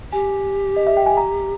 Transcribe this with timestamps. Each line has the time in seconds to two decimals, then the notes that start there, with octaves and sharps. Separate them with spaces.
0.13 G4 G#5
0.76 D#5
0.87 E5
0.97 G5
1.06 G#5
1.17 A#5